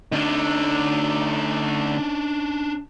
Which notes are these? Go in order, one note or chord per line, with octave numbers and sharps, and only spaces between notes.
D2 D3 D4 D#4